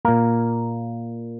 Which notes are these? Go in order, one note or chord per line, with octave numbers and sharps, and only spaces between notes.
A#2 A#3 A#4